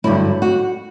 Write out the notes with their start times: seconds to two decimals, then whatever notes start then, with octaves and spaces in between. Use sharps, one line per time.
0.04 G2 D3 F#3 E4
0.42 F#4